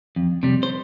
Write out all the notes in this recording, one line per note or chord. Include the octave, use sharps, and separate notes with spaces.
F2
C3 G3
C5